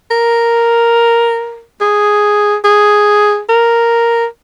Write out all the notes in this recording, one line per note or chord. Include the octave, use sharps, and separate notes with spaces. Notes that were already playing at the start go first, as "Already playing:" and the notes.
A#4
G#4
G#4
A#4